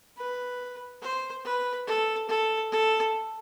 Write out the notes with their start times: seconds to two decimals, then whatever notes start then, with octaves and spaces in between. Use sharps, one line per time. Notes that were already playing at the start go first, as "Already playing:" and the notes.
0.17 B4
1.02 C5
1.44 B4
1.87 A4
2.29 A4
2.71 A4